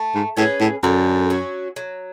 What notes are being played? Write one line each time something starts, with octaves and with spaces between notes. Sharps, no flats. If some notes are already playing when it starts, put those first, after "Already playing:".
Already playing: A3
G#2
A2 C#4 G#4 B4
A2
F#2 D3
F#3 C#4 F#4
F#3